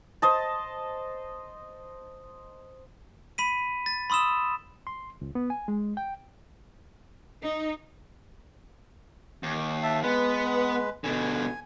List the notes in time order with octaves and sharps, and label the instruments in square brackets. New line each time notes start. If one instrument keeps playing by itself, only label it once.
[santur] C5 D#5 A5
[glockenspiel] B5 B6 D#7
A6
B5 C6 D#6 E6 E7
[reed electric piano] C6
C#2
B3
G#5
G#3
G5
[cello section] D#4
[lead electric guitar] D#2
[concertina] E5 A5
[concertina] G#3 B4 [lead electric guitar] B3
[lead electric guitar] B2 D3 [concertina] G#5